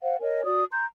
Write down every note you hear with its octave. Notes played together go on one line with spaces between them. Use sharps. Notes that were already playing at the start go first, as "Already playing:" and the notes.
C5 F5 F#5
A#4 C#5 D#5 G#5
F#4 D5 D#6
A#5 C6 G6